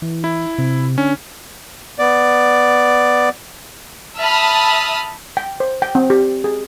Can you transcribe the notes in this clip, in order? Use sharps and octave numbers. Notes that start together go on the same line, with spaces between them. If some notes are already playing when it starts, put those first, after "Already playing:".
E3
E4
C3
D3 C#4
B3 D5
E5 A5 B5 D#6 F6
G5
C5
G5
C4
G4
G#4